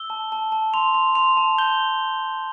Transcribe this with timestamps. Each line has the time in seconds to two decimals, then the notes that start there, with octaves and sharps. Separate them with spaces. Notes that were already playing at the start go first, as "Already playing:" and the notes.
Already playing: E6 G7
0.10 A5
0.32 A5
0.52 A5
0.74 C6 F7
0.94 C6
1.15 C6 F7
1.37 A5
1.58 G6 G7